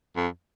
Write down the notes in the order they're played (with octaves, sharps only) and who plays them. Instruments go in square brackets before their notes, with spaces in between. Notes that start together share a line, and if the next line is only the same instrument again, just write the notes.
[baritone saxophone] F2